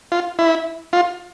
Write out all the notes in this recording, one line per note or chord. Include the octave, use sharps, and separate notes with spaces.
F4
E4
F4